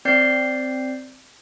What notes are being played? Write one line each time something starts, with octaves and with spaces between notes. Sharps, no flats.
C4 D5 G6 C7